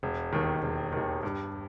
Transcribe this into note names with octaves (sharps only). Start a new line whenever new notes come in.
E1
D#2 D#3
E1
D#2 D#3
G2